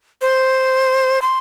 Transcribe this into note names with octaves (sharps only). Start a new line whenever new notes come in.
C5
C6